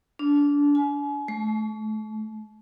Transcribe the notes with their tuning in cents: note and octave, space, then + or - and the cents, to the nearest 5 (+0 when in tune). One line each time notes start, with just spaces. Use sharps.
D4 -25
G#5 +40
A3 -35